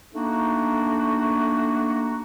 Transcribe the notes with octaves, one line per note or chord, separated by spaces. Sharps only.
A3 A#3 D4 D#4 F#4